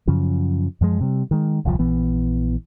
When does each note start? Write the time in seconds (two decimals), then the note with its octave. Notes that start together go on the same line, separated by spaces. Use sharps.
0.07 F#2 C#3 F3
0.81 F#2 F3 G#3
1.01 C3 G3
1.31 D#3 G#3
1.65 D#1 C2 D3 F3
1.79 A#1 E3 B3